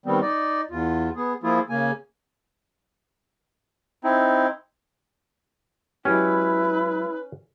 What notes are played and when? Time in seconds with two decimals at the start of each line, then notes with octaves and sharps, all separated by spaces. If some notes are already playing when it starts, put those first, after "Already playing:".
0.06 D#3 G3 B3 C4
0.22 D#4 D5
0.71 E2 F4
1.16 B3 G#4
1.43 F3 A#3 E4 F4 G#4
1.70 C#3 A#3 G#5
4.04 C4 D#4 E4
6.05 F#3 G#3 C#4 E4 G4 B4